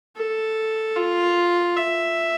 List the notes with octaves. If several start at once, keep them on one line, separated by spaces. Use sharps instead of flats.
A4
F4
E5